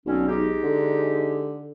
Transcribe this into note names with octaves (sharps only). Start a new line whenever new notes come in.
B1 D3 C4 C#4
G#3 D#4 G4
D3